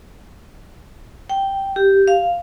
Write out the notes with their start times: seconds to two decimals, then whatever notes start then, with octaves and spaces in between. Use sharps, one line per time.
1.30 G5
1.76 G4
2.08 F5